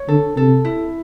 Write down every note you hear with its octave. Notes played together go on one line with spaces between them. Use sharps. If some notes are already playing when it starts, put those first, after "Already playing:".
Already playing: C#5
D3 A4
C3 A4
E4